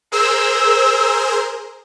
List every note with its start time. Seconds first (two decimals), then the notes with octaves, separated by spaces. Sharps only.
0.12 G#4 A#4 C5 E6